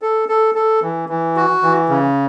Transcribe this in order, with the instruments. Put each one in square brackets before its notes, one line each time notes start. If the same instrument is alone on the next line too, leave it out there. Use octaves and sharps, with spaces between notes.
[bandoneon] A4
A4
A4
E3
E3
F#4
E3
C#3